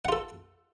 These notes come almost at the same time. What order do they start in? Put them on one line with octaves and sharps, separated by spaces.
F#5 F4 A4